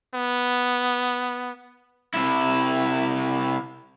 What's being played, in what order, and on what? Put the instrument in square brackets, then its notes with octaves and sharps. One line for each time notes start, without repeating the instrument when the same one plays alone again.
[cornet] B3
[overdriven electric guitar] C3 E4